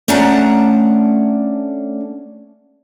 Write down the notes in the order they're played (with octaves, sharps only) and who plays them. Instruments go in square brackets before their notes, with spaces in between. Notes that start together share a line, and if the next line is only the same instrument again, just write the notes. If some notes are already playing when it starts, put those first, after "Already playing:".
[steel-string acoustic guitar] A3 C#4 D4 F#5 A5 A#5